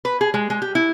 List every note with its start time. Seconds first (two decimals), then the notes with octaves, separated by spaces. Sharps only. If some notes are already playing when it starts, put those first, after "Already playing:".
0.05 B4
0.21 G#4
0.34 G#3
0.50 G#3
0.62 G4
0.75 E4